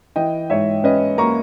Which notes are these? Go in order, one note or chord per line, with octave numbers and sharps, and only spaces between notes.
E3 D#5 G5
G#2 C#5 E5
C#4 B4 D#5
A#3 A#5 C#6